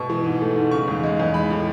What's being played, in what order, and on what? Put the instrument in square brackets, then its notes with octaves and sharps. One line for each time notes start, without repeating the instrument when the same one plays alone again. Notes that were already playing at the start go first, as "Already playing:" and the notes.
Already playing: [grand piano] B2 C#6
E3
G#2
A3
G#2
C#3 C#6
E2
G#3
E2
G#3 B5
A2